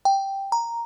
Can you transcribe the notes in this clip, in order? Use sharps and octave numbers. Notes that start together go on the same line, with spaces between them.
G5
A#5